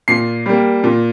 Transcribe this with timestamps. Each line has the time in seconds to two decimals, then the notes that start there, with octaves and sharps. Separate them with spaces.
0.08 A#2 C7
0.46 G3 A#3
0.83 A#2